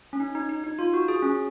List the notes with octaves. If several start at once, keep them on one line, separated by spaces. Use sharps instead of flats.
C#4
D#4
D#4
D#4
D#4
F4
F#4
G#4
C#4